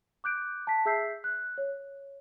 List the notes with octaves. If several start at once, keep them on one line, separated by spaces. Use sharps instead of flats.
D6 F#6 G6 D7
A5 B6
G#4 E5 E6 G6 B6 C7
F#6
C#5